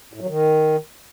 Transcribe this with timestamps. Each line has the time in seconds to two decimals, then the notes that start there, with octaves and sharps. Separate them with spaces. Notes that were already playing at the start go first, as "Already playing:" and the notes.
0.14 A2
0.20 F#3
0.27 D#3